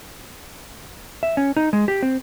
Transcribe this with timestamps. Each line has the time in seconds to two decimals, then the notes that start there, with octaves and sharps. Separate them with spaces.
1.23 E5
1.37 C#4
1.56 D#4
1.73 G#3
1.88 G4
2.03 C4